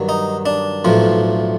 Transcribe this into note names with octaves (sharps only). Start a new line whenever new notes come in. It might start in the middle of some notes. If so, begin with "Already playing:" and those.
Already playing: G2 D#3 F#3
D#4
D4
B1 A2 F3